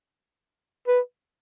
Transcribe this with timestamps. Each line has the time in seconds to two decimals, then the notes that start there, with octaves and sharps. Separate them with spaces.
0.88 B4